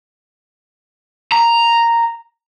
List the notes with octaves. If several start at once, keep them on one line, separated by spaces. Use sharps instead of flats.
A#5